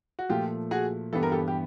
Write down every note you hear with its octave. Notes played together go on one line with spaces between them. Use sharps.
F#4
A#2 F3 A3 F4 G4
F#4 G#4
G2 E3 G3 B3 A4
A#4
G4 A4
G4